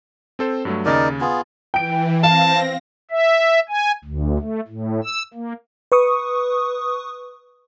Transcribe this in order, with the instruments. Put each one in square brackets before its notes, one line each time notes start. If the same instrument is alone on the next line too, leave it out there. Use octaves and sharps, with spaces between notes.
[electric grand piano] C4 A4 C5
G2 F#3 A3
[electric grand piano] D#2 C#3 A6 [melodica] D#4 A#4 D5
[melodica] B3 F4 G#4
[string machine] E3 [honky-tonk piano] G5 D7
[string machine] C4 A#6 [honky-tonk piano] F5 [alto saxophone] A5
[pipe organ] E5
G#5
D2
A3
A2
E6
A#3
[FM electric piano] B4 C#6 D#6